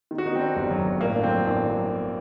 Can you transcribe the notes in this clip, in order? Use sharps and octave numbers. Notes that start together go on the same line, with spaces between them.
D#3
F#4
D#4
D#3 C4
D4
G1 G3
F#3
G1
A2 A#3
D4
F#3 C4
A1 D4
F#3